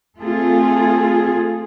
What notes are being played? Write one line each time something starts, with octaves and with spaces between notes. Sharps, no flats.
A3 C4 F4 G#4 A4